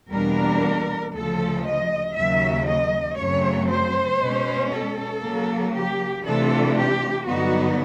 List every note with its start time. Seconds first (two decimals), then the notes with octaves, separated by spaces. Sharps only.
0.11 E2 B2 G3 A#3 D4 A#4
1.14 D2 C#3 F3 A4
1.65 D#5
2.16 D#2 C#3 F#3 E5
2.67 D#5
3.18 F#2 C#3 F#3 A3 C4 C#5
3.69 C5
4.20 B2 G#3 C#4
4.72 A4
5.23 C#3 F#3 A#3
5.74 G4
6.24 C3 E3 A3 D4 F4 A4
6.76 G4
7.27 G2 D3 F#3 B3 D#4 F#4